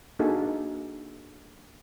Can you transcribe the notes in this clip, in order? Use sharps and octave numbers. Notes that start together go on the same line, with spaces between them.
A#3 D4 D#4 F#4 G#4 A4